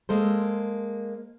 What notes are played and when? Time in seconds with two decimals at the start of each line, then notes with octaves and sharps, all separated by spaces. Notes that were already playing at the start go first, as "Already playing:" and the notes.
0.09 G#3 A#3 A4 C5